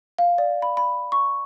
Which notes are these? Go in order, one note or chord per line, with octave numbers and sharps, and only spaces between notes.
F5
D5
B5
B5
C#6